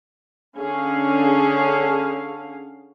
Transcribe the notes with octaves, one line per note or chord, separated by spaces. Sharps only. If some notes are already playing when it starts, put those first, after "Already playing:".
D3 C#4 G#4 F5